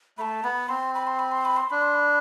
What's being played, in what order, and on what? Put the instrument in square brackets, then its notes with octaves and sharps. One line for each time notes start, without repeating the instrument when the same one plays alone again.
[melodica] A3 [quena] B5
[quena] A5
[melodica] B3 [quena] B5
[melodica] C4 [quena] C6
[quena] B5
C6
B5
C6
B5
C6
[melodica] D4 [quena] B5
[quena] C6
B5